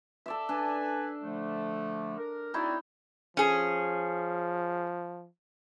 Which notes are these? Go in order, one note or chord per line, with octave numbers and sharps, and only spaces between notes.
A4 D5 E5
D4 A4 B4 G#5
D3 F3 A3
A#4
C4 D#4 E4 F#4 C#5 D5
F3 C#4 G#4